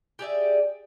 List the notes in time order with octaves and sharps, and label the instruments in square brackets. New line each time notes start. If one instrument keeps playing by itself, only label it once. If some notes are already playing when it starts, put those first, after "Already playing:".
[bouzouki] G4 G#4 D5 E5